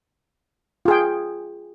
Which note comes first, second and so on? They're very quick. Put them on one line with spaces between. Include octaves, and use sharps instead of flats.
F4 G#4 G5